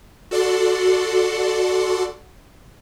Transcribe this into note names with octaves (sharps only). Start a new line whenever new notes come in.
F#4 A4 D5 F#5 C6